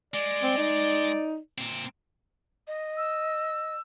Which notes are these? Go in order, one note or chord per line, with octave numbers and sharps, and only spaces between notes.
G#3 D5
C4
D#4
A#2 C4
D#5
E6